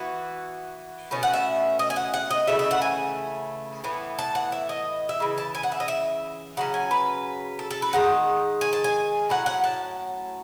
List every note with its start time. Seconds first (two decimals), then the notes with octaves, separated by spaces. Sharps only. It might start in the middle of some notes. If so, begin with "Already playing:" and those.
Already playing: E3 B3 F#4
1.11 B2 A3 C#4
1.23 F#5
1.34 E5
1.79 D#5
1.90 G#5
1.96 F#5
2.14 F#5
2.31 D#5
2.47 C#3 E3 A3 E5
2.59 E5
2.71 F#5
2.82 G#5
3.84 A2 E3 B3
4.19 A5
4.35 F#5
4.52 E5
4.69 D#5
5.09 E5
5.20 C#3 E3
5.38 A5
5.55 G#5
5.63 F#5
5.72 E5
5.80 D#5
5.88 E5
6.57 C#3 F#3 C#4 F#5
6.74 G#5
6.91 B4
7.59 A4
7.71 A4
7.82 B4
7.93 D#3 G#3 F#5
8.61 G#5
8.73 A5
8.84 G#5
9.29 A2 F#3 C#4 F#5
9.46 F#5
9.64 A5